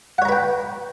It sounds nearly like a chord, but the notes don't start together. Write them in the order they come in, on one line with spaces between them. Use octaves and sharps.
F#5 C#5 A#5 B4 G5